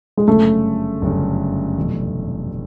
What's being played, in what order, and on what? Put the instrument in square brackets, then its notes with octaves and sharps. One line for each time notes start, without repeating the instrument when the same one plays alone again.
[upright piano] G#3
[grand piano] G1 F#2 C#3 [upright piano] A3
[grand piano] G1 F#2 C#3
F1 E2 B2 F#3